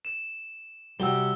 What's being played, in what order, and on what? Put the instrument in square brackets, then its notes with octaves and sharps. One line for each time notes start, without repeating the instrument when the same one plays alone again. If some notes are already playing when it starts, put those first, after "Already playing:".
[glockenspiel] E7
[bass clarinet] C3 [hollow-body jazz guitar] G3 F#4 G4 [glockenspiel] E6 G7